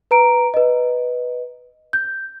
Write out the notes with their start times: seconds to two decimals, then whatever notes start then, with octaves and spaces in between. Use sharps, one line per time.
0.11 B4 A#5 D7
0.54 B4 D#5
1.93 G6